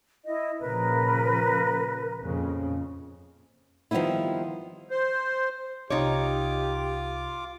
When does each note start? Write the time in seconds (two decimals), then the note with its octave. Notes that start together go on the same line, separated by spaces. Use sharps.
0.26 E4 D#5
0.60 A#2 C#3 F3 A#4 B4
2.21 F2 A#2 C#3
3.91 D#3 F3 G3 B3 D#4 E4
4.91 C5
5.90 C2 D#4 F4 G4 C#5 D6